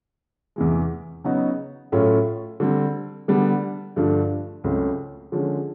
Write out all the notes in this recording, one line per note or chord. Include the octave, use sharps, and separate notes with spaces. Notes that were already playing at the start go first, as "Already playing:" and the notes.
E2 C3 E3 G#3
C#3 F#3 B3 D#4 F#4
A2 F#3 A3 C#4 F4
D3 G3 C4
D3 G3 B3 D4
G2 D3 F3 A3 D4
C#2 C#3 F#3 A3 C4
D3 F3 G#3 C#4